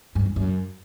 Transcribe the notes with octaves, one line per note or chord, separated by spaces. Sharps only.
G2
E2
F#2